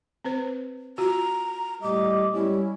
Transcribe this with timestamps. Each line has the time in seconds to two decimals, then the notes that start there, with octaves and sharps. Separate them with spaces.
0.24 C4 B4 C5
0.98 F4 F#4 A#5
1.83 A2 G3 D#5 D6
2.34 G3 B3 C#4 E4